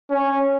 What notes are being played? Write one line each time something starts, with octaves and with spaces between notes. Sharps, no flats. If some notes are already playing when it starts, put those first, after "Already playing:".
C#4